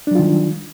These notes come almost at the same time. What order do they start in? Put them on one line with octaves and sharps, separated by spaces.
D4 F#3 F4 D#3 G3